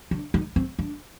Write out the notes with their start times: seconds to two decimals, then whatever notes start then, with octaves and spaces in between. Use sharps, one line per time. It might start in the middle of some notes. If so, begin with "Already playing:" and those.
0.11 D4
0.34 D#4
0.56 C4
0.79 D4